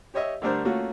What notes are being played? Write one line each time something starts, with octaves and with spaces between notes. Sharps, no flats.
G4 C#5 D#5 E5
D3 G3 A3 D4 A#4 C5
A3 A#3 C#4 F4 F#4